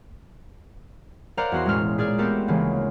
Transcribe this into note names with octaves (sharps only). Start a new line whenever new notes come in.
A#4 C5 D5 F5 F#5 A#5
E2 F#4 C6
E1 A2 G#3 C#4 F6
A#2 G#4 D5 F6
A3 B3 C4 G4 A4 A#4
D2 C#3 E3 G#3 A#3